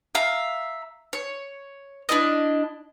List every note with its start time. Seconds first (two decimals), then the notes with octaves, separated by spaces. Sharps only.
0.15 E5 F5 A#5
1.13 C#5
2.09 D4 E4 F4 D#5